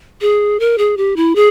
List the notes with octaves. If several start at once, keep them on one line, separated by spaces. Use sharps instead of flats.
G#4
A#4
G#4
G4
E4
G#4